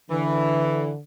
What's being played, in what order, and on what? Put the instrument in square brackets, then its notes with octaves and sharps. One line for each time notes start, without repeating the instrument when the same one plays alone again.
[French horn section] D3 [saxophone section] E3